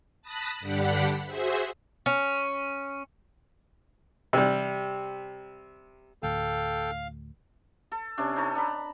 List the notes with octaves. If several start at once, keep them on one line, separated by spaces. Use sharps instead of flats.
A5 B5 D#6 F#6 A#6 B6
G2 D3 D4 G4 F#5 B5
F#4 G#4 C5 E5
C#4
C3 G3
D2 A2 A4 F5 G5
A4
C3 C#4 D4
D#4 A4 C#5
D4 A#5 B5